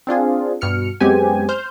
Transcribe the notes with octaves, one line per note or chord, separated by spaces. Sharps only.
C4 D4 F4 G#4
G2 B2 F6 C#7
F#2 G#3 B3 C4 G4 G#5
C5 F6 G6